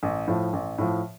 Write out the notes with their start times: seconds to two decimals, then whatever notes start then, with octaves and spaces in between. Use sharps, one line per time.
0.03 A1
0.28 A2 F3
0.53 A1
0.78 A2 F3